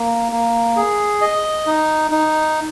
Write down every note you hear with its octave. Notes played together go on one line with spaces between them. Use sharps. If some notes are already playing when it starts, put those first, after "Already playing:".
Already playing: A#3
A#3
G#4
D#5
D#4
D#4